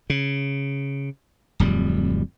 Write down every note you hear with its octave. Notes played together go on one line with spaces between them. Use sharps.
C#3
D1 F2 G3